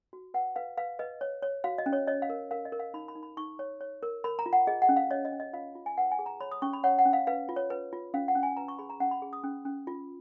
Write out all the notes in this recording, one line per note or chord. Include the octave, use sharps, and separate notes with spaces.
F#4
B4 F#5
B4 F5
B4 F5
B4 D#5
C#5
C#5
F#4 F5
D#5
C#4
C#5
C#5 D#5
F5
A#4
A#4 F5
D#5
A#4
F5
D#4 B5
B5
D#4
B5
D#4 C#6
C#5
C#5
A#4
A#4 B5
A#5
F4
F#5
G#4 D#5
F#5
C#4
F5
C#5 D#5
D#5
C#4
D#5
F4 F5
F4
G#5
B4 F#5
G#5
G#4
A#5
C#5 B5
D#6
C#4 C#6
B5
C#5 F#5
F#5
C#4
F5
B4 F5
F4
C#5
B4
F4
C#4 F5
F#5
C#4
G#5
B4 A#5
C#6
G#4 B5
A#5
C#4 F#5
B5
G#4
D#6
C#4
C#4
F4